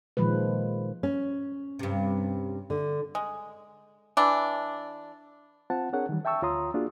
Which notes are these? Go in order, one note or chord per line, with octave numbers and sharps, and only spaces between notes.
A#2 D#3 F3 G#3 B4
C#4
G2 C3
D3
G#3
E3 D4
C4 F4 C5 F#5 A5
C4 D4 G#4 A#4 C#5 F#5
D#3 E3 G3
E5 G5 A5 C#6 E6
D2 F4 C#5 A#5 C6 D#6
A#3 D4 F4 F#4 G#4